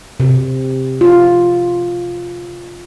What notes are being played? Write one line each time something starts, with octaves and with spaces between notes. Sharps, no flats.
C3
F4